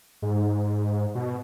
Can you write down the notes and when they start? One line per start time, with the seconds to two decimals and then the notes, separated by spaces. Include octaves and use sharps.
0.22 G#2
1.15 B2